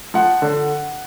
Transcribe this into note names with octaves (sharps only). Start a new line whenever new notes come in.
F3 F#5
D3